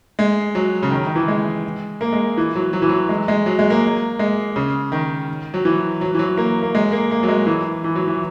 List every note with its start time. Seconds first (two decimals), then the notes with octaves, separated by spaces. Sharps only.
0.19 G#3
0.55 F#3
0.83 C#3
0.91 D#3
1.07 D#3
1.16 E3
1.28 G#3
2.01 A#3
2.13 G#3
2.37 E3
2.55 F#3
2.73 F#3
2.82 E3
2.89 F#3
3.09 G#3
3.28 G#3
3.46 F#3
3.59 G#3
3.70 A#3
4.19 G#3
4.56 C#3
4.92 D#3
5.54 F#3
5.65 E3
6.01 F#3
6.14 E3
6.19 F#3
6.37 A#3
6.63 A#3
6.75 G#3
6.92 A#3
7.11 A#3
7.23 F#3
7.28 G#3
7.47 E3
7.84 E3
7.95 F#3
8.08 E3